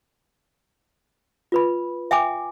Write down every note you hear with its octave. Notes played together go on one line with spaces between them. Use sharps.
F4 B4 B5
E5 G5 G#5 D6